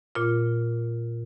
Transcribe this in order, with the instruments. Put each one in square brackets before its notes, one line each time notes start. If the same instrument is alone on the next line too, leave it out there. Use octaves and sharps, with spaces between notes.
[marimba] A#2 F4